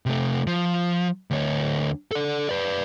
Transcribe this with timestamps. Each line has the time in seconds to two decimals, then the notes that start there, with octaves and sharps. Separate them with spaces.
0.06 C3 A3
0.47 F3
1.31 D2 C#5
2.11 A4 D5
2.49 B4 D5